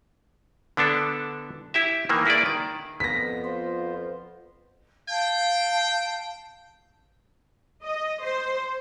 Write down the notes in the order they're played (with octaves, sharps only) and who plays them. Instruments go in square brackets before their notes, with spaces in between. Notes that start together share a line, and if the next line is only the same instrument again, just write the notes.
[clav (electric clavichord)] D3 B3 D4 A4
E4 G4 E5
D#3 E3 A#3
A#3 E4 G#4 B4 D5
D#3
[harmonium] F2 B3 [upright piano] A#6 B6
[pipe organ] F4 C5
[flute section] F5 A5 [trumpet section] G5
[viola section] D#5
C5